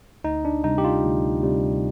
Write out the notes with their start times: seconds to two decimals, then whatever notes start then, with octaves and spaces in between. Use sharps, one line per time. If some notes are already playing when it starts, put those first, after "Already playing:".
0.24 D2 D#4
0.45 D4
0.64 C3 G3 D#4
0.78 G4
0.84 F4
1.03 D2
1.42 C3 G3